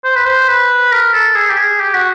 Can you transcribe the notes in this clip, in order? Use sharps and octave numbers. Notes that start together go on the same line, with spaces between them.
C5
B4
C5
B4
A#4
A4
G#4
G4
G#4
G4
F#4